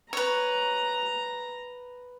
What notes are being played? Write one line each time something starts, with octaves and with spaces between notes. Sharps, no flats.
B4 C#5 A#5